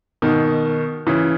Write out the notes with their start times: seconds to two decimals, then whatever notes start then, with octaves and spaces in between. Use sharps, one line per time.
0.22 B2 D#3
1.07 C#3 E3